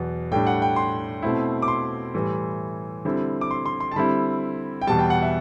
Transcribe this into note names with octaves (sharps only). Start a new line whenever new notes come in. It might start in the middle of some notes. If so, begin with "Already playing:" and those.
Already playing: E2 B2 F#3 B3
A2 G3 D4 G5
F#5
G5
C6
B2 A3 C4 E4
D6
C6
A2 E3 G3
D3 G3 C4 E4
D6
C6
C6
C6
A5
D3 G3 C4 E4 B5
G5
E2 B2 G3 A5
G5
F#5
E5